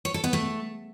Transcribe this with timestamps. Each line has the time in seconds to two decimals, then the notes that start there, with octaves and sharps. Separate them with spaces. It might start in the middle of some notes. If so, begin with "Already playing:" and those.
0.05 C#5
0.14 A4
0.24 B3
0.33 A3